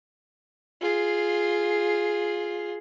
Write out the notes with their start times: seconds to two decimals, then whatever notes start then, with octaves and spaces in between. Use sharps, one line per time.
0.81 F4 G#4